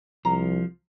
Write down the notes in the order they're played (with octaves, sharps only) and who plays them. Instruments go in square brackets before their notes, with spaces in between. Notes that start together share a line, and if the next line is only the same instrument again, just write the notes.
[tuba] C2 [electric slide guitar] F3 [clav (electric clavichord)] A#5